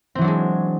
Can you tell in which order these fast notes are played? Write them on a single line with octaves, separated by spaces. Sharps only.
C4 E3 F#3 D4 G#3